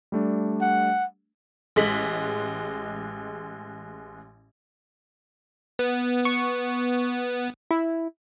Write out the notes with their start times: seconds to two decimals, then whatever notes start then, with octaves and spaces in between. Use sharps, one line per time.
0.12 G3 A3 D4
0.61 F#5
1.76 A1 G#3 B6 F#7
5.79 B3
6.25 C#6
7.71 E4